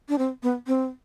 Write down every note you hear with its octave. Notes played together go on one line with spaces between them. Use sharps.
D4
C4
B3
C4